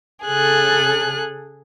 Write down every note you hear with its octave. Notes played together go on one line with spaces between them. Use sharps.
C#3 G#4 A4 F#6